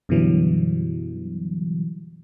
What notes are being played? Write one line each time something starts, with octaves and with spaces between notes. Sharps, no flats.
F#2 B2 D3 E3 F#3 G3